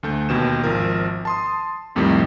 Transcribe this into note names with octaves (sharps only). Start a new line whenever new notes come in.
D2 A3 G6
D#2 B2 E7
G#1 F3 A#4
A5 C6 D#6
C2 F2 A2 C3 D#3 G3